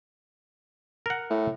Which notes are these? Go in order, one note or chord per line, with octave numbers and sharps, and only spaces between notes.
A#4 F#5
A2